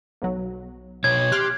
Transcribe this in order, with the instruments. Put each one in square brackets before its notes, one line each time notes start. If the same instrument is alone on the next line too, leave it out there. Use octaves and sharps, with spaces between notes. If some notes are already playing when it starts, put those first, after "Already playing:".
[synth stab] B1 F#3
[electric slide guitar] B2 C#5 [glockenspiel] G#6
[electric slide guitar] G4 [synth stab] C6 F6 F#6